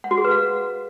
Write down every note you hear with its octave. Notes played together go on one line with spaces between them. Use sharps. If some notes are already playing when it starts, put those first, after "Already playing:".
F#5
F#4
G#4
B4
F5